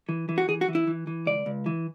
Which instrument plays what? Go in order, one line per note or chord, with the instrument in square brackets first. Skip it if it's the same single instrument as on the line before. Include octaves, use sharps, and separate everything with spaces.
[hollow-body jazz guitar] E3
E3
F#4
E3 G#4
F#4
E3
E4
E3
E3
C#2 D5
C#2
E3